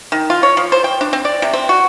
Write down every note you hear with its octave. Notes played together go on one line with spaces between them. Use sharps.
D#3
F4
C#5
F3
C5
G5
D4
C4
D5
C3
C4
F#4